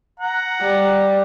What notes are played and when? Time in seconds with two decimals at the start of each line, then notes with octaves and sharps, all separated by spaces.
0.20 F#5 A#5
0.61 G3